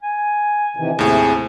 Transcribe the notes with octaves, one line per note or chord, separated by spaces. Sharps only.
G#5
C3 D#3 E3
D#2 A2 C3 G#4